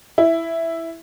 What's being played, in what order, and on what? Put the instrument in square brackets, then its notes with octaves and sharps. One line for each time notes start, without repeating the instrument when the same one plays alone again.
[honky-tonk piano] E4